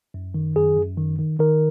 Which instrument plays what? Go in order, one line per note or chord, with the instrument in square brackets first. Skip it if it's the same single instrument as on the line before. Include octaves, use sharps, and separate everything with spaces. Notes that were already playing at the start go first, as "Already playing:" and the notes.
[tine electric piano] F#2
D#3
F#2 G#4
F#2
D#3
D#3
D#3 A#4